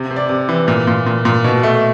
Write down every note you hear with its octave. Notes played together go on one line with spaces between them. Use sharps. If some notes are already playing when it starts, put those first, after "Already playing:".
Already playing: C3
C3
D5
C3
E3
A#2
A#2
A#2
A#2
B2
A3